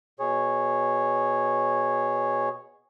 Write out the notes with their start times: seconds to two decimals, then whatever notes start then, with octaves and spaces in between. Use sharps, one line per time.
0.20 B2 G#4 C#5